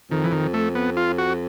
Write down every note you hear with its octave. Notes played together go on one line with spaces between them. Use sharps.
F2 D#3
E3
D#3
A3
B3
F4
F#4